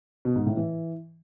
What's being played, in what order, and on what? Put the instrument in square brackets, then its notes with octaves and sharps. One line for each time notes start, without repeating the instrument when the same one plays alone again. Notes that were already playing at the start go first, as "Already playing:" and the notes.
[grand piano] B2
G#2
A2
E3